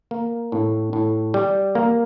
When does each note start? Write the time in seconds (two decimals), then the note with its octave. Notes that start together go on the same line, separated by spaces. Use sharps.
0.11 A#3
0.52 A2
0.93 A2
1.34 G3
1.75 A#3